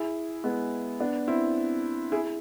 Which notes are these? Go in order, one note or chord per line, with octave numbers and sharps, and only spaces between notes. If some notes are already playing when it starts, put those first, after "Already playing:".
Already playing: E4 G#4
G#3 B3
B3 D4
C4 E4
E4 G#4